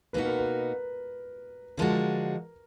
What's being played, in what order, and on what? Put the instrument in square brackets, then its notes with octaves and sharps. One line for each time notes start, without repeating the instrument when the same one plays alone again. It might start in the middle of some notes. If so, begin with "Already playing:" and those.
[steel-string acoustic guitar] B2 A#3 D#4 F#4 [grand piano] B4
[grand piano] A#4
B4
[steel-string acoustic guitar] D3 F3 G#3 D4 F#4 [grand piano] A#4